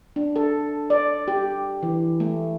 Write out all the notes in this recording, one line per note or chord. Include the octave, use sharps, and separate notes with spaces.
D4
A4
D5
G4
E3
A3